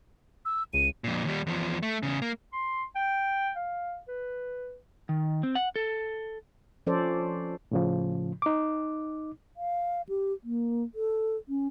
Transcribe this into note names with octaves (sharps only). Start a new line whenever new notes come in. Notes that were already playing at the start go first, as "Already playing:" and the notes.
E6
C#2 D#7
F2 A#2
D#2 G3
E2 F3
A3
E2 C#3
A#3
C6
G5
F5
B4
D#3
C4
F#5
A4
F3 C#4 A4 C5 D5
A2 C#3 F3
D#4 D6
F5
G4
A#3
A4
C#4